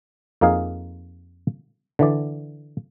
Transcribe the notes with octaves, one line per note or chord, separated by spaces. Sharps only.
F2 A#3 D#4 G#4 F5
D3 E3 D5